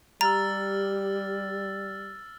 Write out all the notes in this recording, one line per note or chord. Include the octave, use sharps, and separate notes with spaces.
G3 G4 A#5 E6 F6 A6